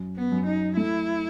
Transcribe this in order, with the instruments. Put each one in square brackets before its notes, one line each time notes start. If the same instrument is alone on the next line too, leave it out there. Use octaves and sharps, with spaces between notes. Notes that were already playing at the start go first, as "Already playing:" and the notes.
Already playing: [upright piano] F#2
[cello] B3
[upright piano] F#2
[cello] D#4
[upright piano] A3 [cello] E4